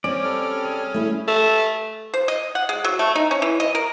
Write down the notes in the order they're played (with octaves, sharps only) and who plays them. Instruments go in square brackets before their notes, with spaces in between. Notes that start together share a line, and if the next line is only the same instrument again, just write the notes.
[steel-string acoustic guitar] C4 [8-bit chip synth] C#4 [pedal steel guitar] D5
[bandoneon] G3 A4 F6
[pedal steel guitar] G#4
[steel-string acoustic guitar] A3 E4
[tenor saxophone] A3
[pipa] C5
D#5
F#5
G#3
F#3
A3
D#4
C#4
E3
D#5
A#4